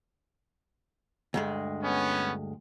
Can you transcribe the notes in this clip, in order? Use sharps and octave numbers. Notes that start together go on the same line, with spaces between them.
D2 G2 G#3
B3 C#4